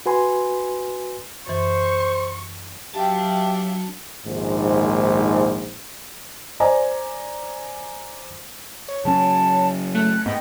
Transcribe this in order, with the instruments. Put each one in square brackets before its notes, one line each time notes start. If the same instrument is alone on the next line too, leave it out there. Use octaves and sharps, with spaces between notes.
[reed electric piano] F#4 B4 G#5 C6
[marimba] F#2 E3 [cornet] C5 [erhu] C#6
[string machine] F#3 C#7 [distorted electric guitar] D4 A5 [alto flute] G4 [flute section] E5 F5 G5
[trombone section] A#1 D#2 G#2
[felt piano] C5 D5 G#5 A#5
[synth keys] C#5
[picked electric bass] C#3 F#3 C#4 [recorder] A5
[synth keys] A3 [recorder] F#6
[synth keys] G#2 G5 [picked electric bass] B3 [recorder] D#5